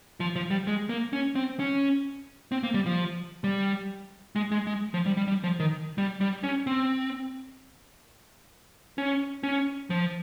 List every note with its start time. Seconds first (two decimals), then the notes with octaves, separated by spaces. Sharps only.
0.20 F3
0.36 F3
0.51 G3
0.67 G#3
0.89 A#3
1.13 C#4
1.35 C4
1.59 C#4
2.52 C4
2.63 A#3
2.74 G3
2.86 F3
3.44 G3
4.35 G#3
4.51 G#3
4.67 G#3
4.94 F3
5.06 G3
5.17 G3
5.28 G3
5.44 F3
5.60 D#3
5.98 G3
6.21 G3
6.44 C#4
6.67 C4
8.98 C#4
9.43 C#4
9.90 F3